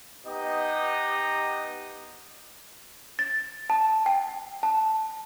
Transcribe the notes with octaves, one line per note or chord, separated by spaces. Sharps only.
B3 D#4 G4 D#5
A6
A5
G5
A5